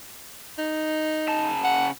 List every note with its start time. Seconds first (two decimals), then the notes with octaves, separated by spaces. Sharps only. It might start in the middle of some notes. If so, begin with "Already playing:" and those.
0.59 D#4
1.28 C#3 A5
1.64 F#5